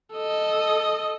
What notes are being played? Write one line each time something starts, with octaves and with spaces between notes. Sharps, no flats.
A4 D#5